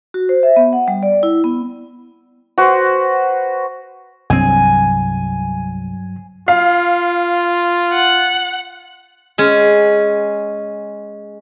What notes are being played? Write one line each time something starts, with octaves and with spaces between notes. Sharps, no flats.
F#4
C5
E5
B3
F#5
G3
D5
E4
B3
F#4 B4 C5
C2 G2 F#3 C4 G#5
F4 F5
F#5
G#3 C#4